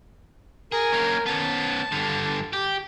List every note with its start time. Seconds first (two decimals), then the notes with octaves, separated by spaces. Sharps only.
0.72 G#4 A#4
0.92 A#3 C#4
1.26 B3 C#4 A5
1.92 G2 D3
2.53 G4